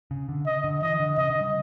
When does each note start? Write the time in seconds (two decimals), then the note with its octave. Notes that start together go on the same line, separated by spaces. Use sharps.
0.11 C#3
0.29 D3
0.46 D#5
0.64 D3
0.82 E3 D#5
1.00 D3
1.18 C#3 D#5
1.30 D3
1.41 G3